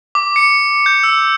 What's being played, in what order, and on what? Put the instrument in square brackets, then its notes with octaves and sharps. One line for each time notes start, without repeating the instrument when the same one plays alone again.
[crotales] D6
C#7
G6
E6